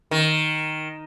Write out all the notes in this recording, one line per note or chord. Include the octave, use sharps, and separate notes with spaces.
D#3